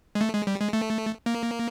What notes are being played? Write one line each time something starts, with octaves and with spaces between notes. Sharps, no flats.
G#3
A3
G#3
G3
G#3
A3
A#3